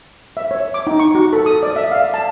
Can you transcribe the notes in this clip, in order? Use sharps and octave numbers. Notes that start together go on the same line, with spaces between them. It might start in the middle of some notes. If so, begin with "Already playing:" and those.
E5
C#5
D6
D#4
C#6
F#4
A4
D#6
D5
E5
F5
A5